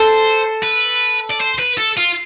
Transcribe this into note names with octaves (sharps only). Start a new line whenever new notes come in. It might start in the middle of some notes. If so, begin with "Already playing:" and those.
Already playing: A4 C5
B4
D5
C5
B4
A4
F4